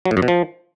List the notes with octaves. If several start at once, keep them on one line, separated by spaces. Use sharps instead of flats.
F#3
A2
F#2
B2
F3